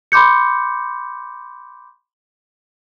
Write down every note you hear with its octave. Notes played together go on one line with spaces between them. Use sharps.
B5 C6 D6 G6 C#7